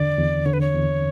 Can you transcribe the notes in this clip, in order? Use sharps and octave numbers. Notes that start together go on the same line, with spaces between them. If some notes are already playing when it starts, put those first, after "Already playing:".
Already playing: E2 D3 D5
E2
D3 C#5
B4
C#5
E2